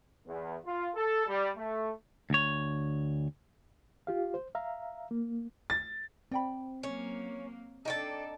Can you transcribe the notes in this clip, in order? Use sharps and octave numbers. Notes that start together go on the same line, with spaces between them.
E2
F4
A4
G3
A3
D2 C#5
F4 G4 F5
C5
E5 F5 A#5
A#3
A6
C4 D5 G5 B5
F#3 A#3 C#4 C#5
D4 D#4 A4 D5 G5 A5